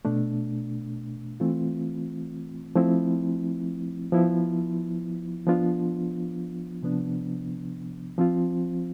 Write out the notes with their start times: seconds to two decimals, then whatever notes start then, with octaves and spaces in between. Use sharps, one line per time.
0.05 B2 A3 D4
1.40 E3 A3 C4 F4
2.75 F3 A3 C4 E4
4.12 F3 B3 E4
5.47 F3 B3 D4 F4
6.82 C3 F3 B3 D4
8.18 F3 C4 F4